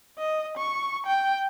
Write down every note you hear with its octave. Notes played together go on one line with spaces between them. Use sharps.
D#5
C#6
G5